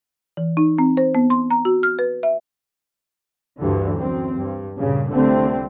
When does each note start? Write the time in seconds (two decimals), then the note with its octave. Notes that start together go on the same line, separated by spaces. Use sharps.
0.37 E3
0.57 D#4
0.78 C4
0.97 C5
1.15 B3
1.30 C6
1.50 A#5
1.65 F#4
1.83 F6
1.99 B4
2.23 E5
3.60 D2 G2 D3 E3
3.98 F#2 C4
4.37 G2
4.79 G2 A#2 C#3
5.10 C2 D3 A3 C4